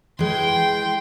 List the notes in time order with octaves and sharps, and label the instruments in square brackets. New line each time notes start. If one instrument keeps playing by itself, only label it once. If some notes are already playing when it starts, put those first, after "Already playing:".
[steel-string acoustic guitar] E3 G#3 [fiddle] G5 C6